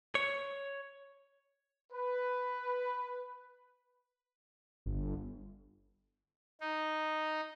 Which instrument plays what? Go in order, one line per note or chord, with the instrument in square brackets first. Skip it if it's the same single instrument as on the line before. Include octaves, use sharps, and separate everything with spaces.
[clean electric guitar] C#5
[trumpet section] B4
[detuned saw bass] G1
[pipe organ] D#4